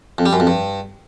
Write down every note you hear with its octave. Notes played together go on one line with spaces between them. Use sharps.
F2
G3
F#2
F2
G2